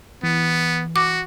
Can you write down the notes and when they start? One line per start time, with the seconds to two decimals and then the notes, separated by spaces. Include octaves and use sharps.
0.23 E3 B3
0.96 F#4 D6